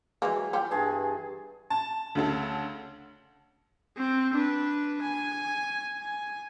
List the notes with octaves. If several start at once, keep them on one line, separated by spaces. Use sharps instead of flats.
E3 F#3 G#3 A#3
G3 F4 G4
G2 G#4 A5
A5
D2 C#3 A4
C4
D4 B4
G#5
G#5